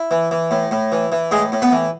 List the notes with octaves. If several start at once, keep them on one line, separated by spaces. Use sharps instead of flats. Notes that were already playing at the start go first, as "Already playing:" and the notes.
Already playing: E4
E3
E3
A2
A2
E3
E3
A2 G#3 G#4
A2
B3 B4
E3